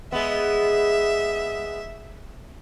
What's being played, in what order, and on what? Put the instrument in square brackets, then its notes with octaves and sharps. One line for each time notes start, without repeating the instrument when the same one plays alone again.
[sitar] G#3 B3 [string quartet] E5